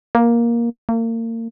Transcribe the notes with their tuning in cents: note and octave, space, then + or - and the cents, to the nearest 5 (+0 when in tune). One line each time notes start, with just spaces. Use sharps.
A#3 +10
A#3 -35